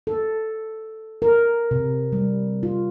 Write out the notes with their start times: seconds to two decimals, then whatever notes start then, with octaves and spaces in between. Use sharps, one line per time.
0.07 A4
1.22 A#4
1.71 C3
2.13 G3
2.63 F4